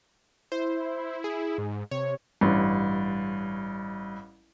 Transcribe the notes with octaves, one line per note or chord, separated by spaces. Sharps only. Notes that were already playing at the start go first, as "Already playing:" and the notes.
E4 C5
G#4
G#2
C3 C#5
A1 G2